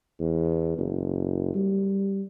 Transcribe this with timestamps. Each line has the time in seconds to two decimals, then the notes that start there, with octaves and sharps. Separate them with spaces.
0.20 E2
0.78 F#1
1.55 G3